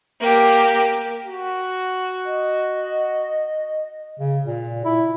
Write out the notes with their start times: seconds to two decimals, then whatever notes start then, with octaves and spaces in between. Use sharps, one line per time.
0.21 A#3 G4
1.27 F#4
2.26 D#5
4.20 C#3
4.45 A#2
4.85 E4